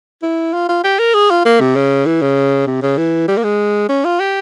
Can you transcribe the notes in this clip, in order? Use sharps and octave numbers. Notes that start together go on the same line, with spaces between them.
E4
F4
F4
G4
A#4
G#4
F4
A#3
C3
C#3
E3
C#3
C3
C#3
E3
G3
A#3
G#3
C#4
F4
G4